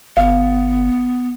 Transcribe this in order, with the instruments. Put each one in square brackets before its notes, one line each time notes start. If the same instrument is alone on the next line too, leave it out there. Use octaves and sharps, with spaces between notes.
[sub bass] G1 [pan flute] B3 [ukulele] F5